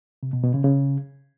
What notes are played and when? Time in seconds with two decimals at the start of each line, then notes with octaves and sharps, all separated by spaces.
0.23 C3
0.33 B2
0.44 B2
0.54 C#3
0.64 C#3